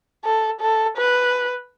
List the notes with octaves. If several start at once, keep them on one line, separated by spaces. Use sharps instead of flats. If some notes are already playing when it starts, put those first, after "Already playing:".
A4
A4
B4